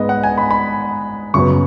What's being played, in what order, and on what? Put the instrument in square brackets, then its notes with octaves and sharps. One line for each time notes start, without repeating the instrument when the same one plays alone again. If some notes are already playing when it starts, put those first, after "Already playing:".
Already playing: [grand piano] G#2 G#3 B3 D#5
F#5
G#5
B5
B5
F#2 C#3 F#3 B3 C#6